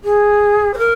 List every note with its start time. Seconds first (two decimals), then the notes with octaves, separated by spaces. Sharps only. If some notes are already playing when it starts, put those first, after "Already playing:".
0.04 G#4
0.73 C5
0.78 A#4